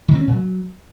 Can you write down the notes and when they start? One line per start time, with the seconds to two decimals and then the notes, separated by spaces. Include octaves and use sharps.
0.08 D#3
0.15 C4
0.21 C#4
0.27 A#2
0.34 F#3